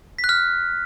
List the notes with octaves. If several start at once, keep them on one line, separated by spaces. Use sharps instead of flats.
B6
F#6
F6